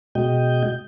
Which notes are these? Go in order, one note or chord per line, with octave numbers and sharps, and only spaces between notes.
B2 G#3 F#4 D#5 G5 G6